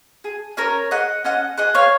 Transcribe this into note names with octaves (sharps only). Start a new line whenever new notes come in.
G#4
C#4 A#4 C#5
G#4 D#5 F#5
C#4 D#5 F#5
G#4 D#5 F#5
C#5 F5